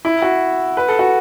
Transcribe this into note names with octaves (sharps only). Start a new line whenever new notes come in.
E4
F#4
B4
A4
F#4